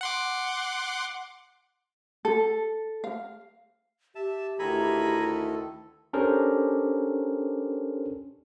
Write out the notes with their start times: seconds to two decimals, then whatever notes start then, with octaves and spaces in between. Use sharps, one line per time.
0.01 F#5 C6 D6
2.25 A4
3.04 F5
4.15 G4 E5 A5
4.59 D2 D#3 E4 A4 G#5 A#5 B5
6.13 C#4 D4 G4 A4 A#4 C5